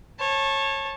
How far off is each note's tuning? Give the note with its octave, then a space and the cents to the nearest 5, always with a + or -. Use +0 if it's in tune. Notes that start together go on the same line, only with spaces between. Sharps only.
C#5 -25 A5 -5